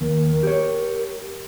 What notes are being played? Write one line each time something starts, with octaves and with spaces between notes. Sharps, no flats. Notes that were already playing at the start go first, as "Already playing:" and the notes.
D#2 A#4
G4 C#5